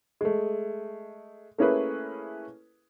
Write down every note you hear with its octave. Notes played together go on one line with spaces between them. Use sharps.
G#3 A3
A3 A#3 C#4 E4 G#4 B4